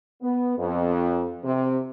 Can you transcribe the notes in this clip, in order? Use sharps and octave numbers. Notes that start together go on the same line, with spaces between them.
B3
F2
C3